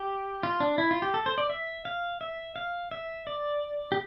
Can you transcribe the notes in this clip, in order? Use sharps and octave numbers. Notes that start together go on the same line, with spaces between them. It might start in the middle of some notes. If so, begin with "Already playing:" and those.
Already playing: G4
F4
D4
E4
F4
G4
A4
C5
D5
E5
F5
E5
F5
E5
D5
G4